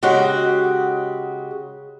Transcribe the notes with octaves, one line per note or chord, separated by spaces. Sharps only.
C#3 G#3 F#4 G4 F#5